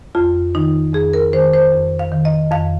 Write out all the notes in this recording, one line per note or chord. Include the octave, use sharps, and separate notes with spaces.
F2 F4
D#3 D#4
F2 G#4
A#4
D#3 C5
C5
F2
F5
D#3
D#5
F2 F5